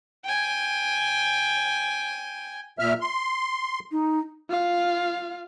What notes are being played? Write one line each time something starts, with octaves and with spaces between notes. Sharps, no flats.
G5 G#5
A#2 E5 F6
C6
D#4
F4 F5